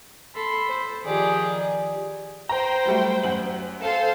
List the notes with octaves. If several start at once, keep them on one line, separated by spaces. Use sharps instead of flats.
A4 B5 C6
A4 C5
D#3 F3 G4 G#4 D5
C5 G5 A#5
F#3 G3 A3
F#2 F#4 F#7
A4 C5 F5